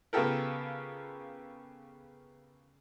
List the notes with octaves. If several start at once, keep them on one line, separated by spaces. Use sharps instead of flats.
C#3 B3 F4 G4 A4 A#4